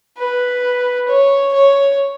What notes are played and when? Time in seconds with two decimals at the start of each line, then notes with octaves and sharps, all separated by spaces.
0.18 B4
1.08 C#5
1.53 C#5